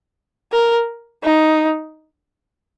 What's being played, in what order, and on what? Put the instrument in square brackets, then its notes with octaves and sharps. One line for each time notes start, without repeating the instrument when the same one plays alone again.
[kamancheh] A#4
D#4